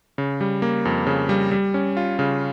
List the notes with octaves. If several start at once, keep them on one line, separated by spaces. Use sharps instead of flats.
C#3
G3
A#3
F2
C#3
G3
G3
C#4
F4
C#3